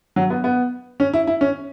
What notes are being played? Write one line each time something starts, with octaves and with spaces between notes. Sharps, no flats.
F#3
B3
B3
C#4
E4
E4
C#4